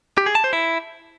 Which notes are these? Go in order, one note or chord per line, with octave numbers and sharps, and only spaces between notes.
G4
G#4
A5
C5
E4